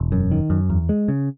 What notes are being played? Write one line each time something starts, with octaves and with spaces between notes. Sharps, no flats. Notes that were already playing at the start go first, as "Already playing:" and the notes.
Already playing: E1
F#2
D#3
F#2
E2
G#3
C#3